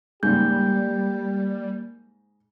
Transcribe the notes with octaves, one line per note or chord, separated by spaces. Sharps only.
G#2 C#3 G3 A#3 G4 G6